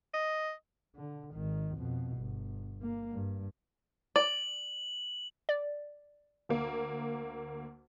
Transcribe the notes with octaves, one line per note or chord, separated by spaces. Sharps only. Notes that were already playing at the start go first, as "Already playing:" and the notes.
D#5
D3
G#1 D#3
F2 B2
G1
A#3
G2
D5 F#7
D5
D2 A#3